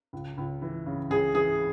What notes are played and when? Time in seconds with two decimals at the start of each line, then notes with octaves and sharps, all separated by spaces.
0.13 C#2
0.38 C#2
0.62 E3
0.86 C#3
1.10 C#2 G#4
1.35 E3 G#4